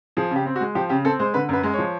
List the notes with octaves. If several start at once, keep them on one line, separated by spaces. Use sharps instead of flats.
F3 G#4
C#3 G4
C4
F#4
G#3
F3 G4
C#3 G4
C4 A4
G#3 C5
D3 B4
F#2 B4
G#3
F3 C#5